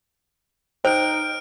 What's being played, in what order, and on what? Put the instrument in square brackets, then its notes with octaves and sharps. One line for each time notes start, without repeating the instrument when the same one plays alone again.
[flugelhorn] D#4 [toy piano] C5 [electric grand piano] G5 [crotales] F6 D7